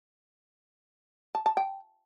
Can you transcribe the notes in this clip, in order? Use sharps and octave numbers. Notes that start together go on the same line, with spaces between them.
A5
A5
G5